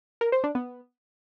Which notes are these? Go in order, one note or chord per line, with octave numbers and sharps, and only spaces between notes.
A#4
C5
D4
B3